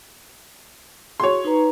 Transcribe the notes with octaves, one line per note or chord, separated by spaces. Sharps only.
F#4 G#4 C#5 C6
D#4 B4 A#5